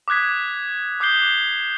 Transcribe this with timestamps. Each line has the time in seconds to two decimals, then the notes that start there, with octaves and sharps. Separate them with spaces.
0.08 D6 D#6 F#6 G#6 B6
1.00 D6 D#6 F#6 G6 C7 G7